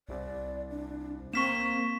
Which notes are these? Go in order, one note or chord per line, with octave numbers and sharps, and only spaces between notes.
C2 D5
D4
A#3 C4 C#6 B6 E7